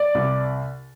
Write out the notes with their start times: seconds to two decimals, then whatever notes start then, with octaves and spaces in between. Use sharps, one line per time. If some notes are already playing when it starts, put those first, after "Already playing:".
Already playing: D5
0.15 C2